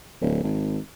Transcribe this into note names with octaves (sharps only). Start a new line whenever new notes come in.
D1
G#1